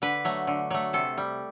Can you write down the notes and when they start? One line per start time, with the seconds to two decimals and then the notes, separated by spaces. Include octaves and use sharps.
0.02 D3 B4
0.25 F#3 A3
0.47 D3
0.70 F#3 A3
0.93 C3 A4
1.18 G3